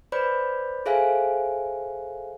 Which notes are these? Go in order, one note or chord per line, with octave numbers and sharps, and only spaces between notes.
B4 C5 D5 B5 G6
G#4 A4 C5 E5 F5 G#5